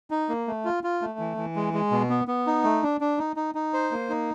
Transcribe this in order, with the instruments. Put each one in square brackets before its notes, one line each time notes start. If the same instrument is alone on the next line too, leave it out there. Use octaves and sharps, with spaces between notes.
[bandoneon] D#4
A#3
A3
F4
F4
A3
E3
E3
G#3
G#3
B2
B3
B3
D#4
A3
D4
D4
D#4
D#4
D#4
C5
A#3
D#4